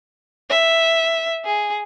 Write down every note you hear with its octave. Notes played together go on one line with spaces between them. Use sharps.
E5
G#4